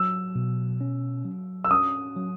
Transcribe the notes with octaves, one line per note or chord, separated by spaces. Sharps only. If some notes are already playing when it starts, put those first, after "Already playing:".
Already playing: F#3 E6
B2
C#4
F#3
E6
C#4 D#6
F#3